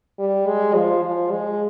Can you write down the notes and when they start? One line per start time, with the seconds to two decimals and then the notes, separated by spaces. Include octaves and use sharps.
0.19 G3
0.47 G#3
0.75 F3
1.04 F3
1.32 G#3